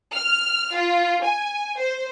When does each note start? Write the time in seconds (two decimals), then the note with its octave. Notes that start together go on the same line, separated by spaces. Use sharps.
0.15 F6
0.76 F4
1.23 G#5
1.79 C5